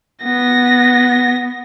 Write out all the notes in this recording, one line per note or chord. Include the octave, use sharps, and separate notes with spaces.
B3 A#6